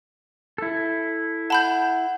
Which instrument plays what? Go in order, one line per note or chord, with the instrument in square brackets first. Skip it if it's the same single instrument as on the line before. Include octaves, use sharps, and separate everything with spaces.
[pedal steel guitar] E4 A4
[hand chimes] F#5 [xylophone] A5 B5 G6